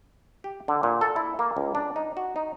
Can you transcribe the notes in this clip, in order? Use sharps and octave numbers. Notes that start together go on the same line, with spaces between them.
G4
D3
A#2
A4
E4
A#3
C#2
D4
D#4
F#4
D#4